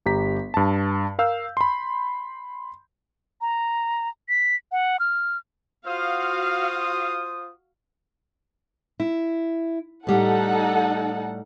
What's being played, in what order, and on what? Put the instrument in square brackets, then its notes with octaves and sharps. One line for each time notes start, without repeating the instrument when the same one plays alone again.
[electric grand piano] G1 G4 A#5 B6
G2 A5
A#4 F5 E6 G6
B5 C6
[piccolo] A#5
B6
F#5
F6
[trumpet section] F4 C5 D#6 [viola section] F#4 F5
[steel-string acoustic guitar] E4
[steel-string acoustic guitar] A2 G3 [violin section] D#4 A4 F#5